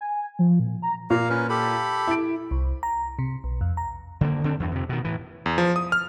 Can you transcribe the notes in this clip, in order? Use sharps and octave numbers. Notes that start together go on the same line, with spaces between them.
G#5
F3
A#2
A#5
A#2 A#3 F5 A#5
C#4 A#4 B4
G4 A4 B5
E4 D7
C2
A#5
C3
B1
F2
A#5
D3 D#3 A3 A#3
D3 C4 D4
E2 G2
F2 C3
B2 D#3
A2 E3
E2
F3
D#6
F6